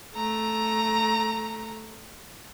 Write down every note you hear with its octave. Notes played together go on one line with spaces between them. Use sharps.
A3 A#5